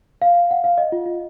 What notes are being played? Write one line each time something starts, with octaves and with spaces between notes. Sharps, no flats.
F5
F#5
F5
D#5
F4
F4